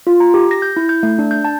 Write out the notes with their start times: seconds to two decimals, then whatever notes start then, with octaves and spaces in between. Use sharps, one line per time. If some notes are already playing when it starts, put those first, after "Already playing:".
0.07 F4
0.20 A#5
0.34 G4
0.51 A#6
0.62 G6
0.77 E4
0.89 G6
1.03 A3
1.19 D4
1.31 G6
1.45 A5